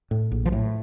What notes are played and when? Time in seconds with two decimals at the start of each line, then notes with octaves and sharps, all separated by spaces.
0.11 A2
0.31 A#1
0.46 F3
0.52 A2